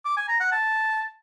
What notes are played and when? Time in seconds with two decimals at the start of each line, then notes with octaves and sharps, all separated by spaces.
0.05 D6
0.17 G#5
0.28 A#5
0.40 F#5
0.52 A5